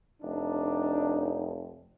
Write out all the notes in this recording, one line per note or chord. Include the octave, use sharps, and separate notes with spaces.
F1 D4 D#4